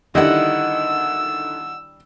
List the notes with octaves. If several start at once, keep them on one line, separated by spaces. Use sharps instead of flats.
D3 D#3 G3 D4 E4 D#5 F#5 E6